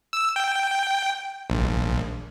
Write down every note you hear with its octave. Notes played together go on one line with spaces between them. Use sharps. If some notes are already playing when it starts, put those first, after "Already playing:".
E6
G5
A#1